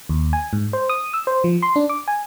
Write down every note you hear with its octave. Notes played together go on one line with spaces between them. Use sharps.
D#2
G#5
G#2
C5
D#6
E6
C5
F3
C6
D4
D6
G#5